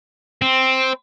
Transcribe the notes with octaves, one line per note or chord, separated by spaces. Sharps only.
C4